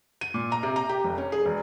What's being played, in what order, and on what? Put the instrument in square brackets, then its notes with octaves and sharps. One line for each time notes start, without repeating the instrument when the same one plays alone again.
[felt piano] D#7
A#2
A#5
C3
A#5
G4
F1
C#4
G#4
E1